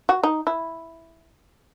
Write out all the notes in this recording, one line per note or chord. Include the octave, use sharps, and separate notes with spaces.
F#4
D#4
E4